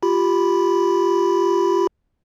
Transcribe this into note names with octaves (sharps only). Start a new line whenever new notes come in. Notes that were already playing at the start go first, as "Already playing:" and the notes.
F4 G4 B5